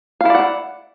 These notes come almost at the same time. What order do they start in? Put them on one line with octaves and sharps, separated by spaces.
F5 E4 D5 F#5